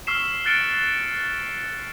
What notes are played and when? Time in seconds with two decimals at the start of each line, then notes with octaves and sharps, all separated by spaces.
0.07 C#6 E6 F6 B6 C7 E7
0.45 F6 F#6 A6 C#7 D7 G7